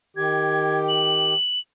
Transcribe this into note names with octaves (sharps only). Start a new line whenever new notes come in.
D#3 G4 G#6
F#7